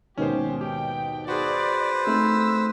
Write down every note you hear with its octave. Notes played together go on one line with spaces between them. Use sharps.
D#2 G#2 B2 C#4 G4 C5
G4 G5
F#4 G#4 B4 C5 D5
A3 C4 D#4 E6